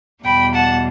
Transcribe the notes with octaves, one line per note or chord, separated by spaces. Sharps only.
E2 B2 G3 G5 B5
F#5 A5